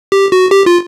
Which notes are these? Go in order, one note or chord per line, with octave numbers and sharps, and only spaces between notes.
G4
F#4
G4
F4